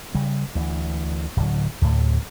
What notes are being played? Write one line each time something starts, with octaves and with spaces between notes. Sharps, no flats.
C#3 G3
D2 E3
D1 D3 F#3
D2 A2